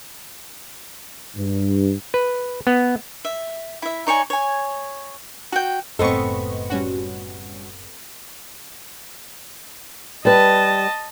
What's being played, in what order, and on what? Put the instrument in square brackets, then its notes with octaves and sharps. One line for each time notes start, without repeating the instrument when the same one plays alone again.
[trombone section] G2
[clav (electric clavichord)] B4
B3
[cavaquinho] E5
E4 E5
D#4 C#5 D5 G#5
C#5 G#5
F#4 G5
[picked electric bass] F#1 A2 [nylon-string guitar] B3 C4 A4 [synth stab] D#5 C#6
[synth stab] G3 C#4 F#4
[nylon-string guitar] G3 B4 [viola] D#5 A5